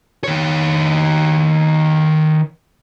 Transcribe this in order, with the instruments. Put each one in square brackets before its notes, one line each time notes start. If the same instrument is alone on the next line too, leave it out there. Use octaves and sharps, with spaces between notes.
[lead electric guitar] D#3 C#5